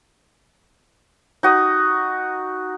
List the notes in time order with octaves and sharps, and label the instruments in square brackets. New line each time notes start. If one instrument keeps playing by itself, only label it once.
[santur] D#4 F#4 D#6